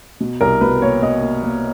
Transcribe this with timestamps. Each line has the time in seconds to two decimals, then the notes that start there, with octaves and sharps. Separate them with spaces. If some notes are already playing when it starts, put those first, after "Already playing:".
0.20 B2
0.41 C2 A#4
0.61 B2 B4
0.82 A#3 C#5
1.02 B2 D#5
1.22 A#3
1.43 A#3